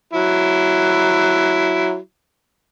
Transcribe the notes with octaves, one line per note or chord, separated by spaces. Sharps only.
F#3 E4